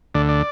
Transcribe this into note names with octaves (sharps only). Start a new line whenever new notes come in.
D2 D3 D5
D5